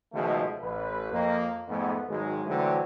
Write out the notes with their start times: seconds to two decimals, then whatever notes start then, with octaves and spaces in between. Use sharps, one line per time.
0.14 C#2 B2 D#3 F3 G#3 A3
0.61 A1 B4
1.12 F2 A#3
1.68 F2 G#2 A3 B3
2.09 G#1 D#3 F#3 G#3
2.46 D3 E3 F#3 A3 C4